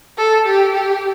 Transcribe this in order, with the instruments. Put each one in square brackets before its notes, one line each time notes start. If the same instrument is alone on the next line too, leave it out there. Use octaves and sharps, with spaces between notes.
[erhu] A4
G4
G4